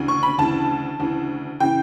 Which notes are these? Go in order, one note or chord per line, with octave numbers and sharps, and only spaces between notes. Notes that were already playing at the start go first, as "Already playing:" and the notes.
Already playing: D2 C#3 E3
C#6
B5
D2 C#3 E3 A5
D2 C#3 E3
C#3 E3 G5